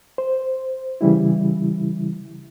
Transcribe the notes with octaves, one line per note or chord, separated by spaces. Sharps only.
C5
C#3 E3 G3 E4